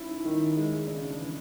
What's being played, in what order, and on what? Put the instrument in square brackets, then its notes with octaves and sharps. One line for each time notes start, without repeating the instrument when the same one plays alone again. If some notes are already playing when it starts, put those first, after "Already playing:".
Already playing: [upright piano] C#4 E4 [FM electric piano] D#4
[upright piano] D#3
G#3
[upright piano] C#3 [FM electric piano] D4
[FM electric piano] D4
[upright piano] E3